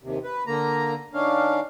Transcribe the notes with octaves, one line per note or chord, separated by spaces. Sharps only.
D#2 C3
B4
D3 A#3 A#5
D#3 C#4 D4 F5